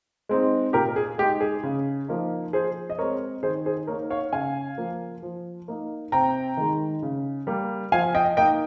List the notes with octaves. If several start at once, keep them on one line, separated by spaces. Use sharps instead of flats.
G#3 C4 D#4
A#2 G4 A#4
G#4
G#3 D#4 G4
G#4
C#3
F3 A#3 D#4
F3 G#4 C5
D#5
G#3 C4 A#4 C#5
D#3 G#4 C5
G#4 C5
A#3 D#4 A#4 C#5
C#5 F5
C#3 F5 G#5
F3 A#3
F3
A#3 D#4
C3 G5 A#5
D#3 G#3
C#3
G3 A#3
F3 F5 G#5
D#5 G5
A#3 D#4 D#5 G5